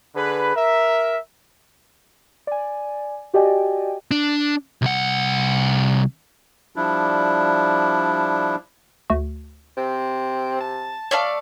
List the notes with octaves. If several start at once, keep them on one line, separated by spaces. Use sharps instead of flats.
D3 G#4 B4
A#4 E5
D5 G#5
F#4 G4 D5 D#5 G5 G#5
D4
C2 F#5
F3 G3 D4 E4
D2 A3 F#4
C3 C4
A5
A3 C#5 D5 F5 A5